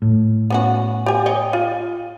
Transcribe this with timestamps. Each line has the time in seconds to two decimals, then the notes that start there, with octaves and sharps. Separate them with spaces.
0.02 A2
0.50 B3 C#4 F#4
1.06 G4 G#5
1.26 C#5 D#5 G5
1.53 F4